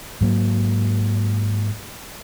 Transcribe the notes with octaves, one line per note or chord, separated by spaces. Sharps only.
G#2 F#3 A#3